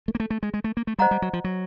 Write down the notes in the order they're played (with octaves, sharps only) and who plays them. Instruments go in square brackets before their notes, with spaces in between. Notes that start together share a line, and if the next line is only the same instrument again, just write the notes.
[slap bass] A3
A#3
A3
A3
G#3
G#3
A3
A#3
A3
[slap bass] G3 [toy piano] C5 D#5 F#5 A#5
[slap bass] G3
F#3
F3
F#3